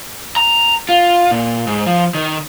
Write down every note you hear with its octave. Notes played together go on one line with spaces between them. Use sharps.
A#5
F4
A#2
G#2
F3
D#3